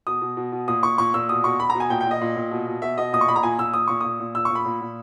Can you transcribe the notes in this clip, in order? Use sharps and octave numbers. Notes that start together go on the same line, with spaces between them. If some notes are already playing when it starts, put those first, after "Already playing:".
B2 D#6
B2
B2
B2
A#2 D#6
A#2 C#6
A#2 C#6
A#2 E6
B2 D#6
B2 C#6
B2 B5
A#5
B2
G#5
A#2 G5
G5
A#2
D#5
A#2
A#2
B2
B2
B2 E5
B2 D#5
A#2 D#6
C#6
A#2 B5
A#5
A#2 G#5
A#2 E6
A#2 D#6
A#2 C#6
A#2 D#6
A#2
A#2 E6
C#6
A#2
B5
A#2
A#2